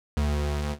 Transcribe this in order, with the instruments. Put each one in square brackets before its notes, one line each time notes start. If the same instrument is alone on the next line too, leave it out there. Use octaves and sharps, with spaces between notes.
[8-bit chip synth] D2